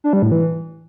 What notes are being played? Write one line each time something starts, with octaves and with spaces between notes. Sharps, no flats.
D4
G3
A2
E3